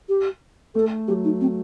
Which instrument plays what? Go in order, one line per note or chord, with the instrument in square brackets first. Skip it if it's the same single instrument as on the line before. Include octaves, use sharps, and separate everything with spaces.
[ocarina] G4
[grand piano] A3 [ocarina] A4
[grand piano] F#3 [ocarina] G4
[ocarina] D#4
C4